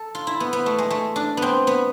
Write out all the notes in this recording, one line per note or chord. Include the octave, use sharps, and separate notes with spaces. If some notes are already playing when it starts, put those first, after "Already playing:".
Already playing: A4
F4
E4
B3
B3
A3
G#3
A3
D4
B3 C4
B3